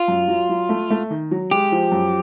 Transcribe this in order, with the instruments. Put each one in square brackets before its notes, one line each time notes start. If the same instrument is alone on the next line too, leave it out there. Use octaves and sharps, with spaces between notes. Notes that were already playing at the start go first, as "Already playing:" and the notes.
Already playing: [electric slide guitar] F4
[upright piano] F#2
F#3
F#3
A3
A3
D#3
F#3
[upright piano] G#3 [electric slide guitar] G4
[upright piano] F3
F#2